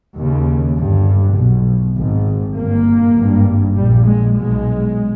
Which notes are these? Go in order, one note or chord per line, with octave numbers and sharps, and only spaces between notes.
D#2 C#3
G1 G2
B1 B2
G#1 G#2
G1 G2 A#3
G#1 G2
A#1 A#2 G3
G#3
B1 B2 G#3